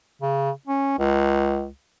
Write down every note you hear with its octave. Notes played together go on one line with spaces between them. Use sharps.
C#3
C#4
C#2